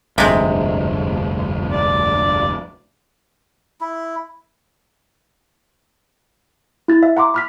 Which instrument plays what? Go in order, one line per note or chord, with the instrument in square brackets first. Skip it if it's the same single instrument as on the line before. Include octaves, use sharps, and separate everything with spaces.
[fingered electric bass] F1 D2 G2 [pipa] C3 G#3
[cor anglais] D5
[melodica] E4
[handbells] E4 A6
E5
F#5 A#5 C6 D6
B5 F6 B6